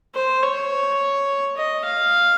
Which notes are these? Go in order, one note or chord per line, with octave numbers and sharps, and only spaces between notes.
C5
C#5
D#5
F5